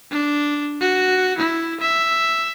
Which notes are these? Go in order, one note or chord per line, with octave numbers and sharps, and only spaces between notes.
D4
F#4
E4
E5